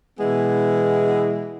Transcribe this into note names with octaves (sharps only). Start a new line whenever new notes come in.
B2 E3 G#3 B3 E4 G#4